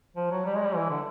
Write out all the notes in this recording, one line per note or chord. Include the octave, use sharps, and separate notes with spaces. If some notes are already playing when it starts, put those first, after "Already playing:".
F3
F#3
G3
G#3
G3
E3
D3